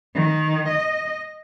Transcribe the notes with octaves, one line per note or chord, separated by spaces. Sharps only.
D#3
D#5